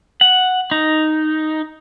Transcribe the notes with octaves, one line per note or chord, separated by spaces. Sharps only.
F#5
D#4